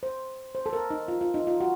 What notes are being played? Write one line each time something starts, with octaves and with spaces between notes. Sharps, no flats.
C5
C5
A4
A#4
D#4
F4
F4
D#4
F4
F#4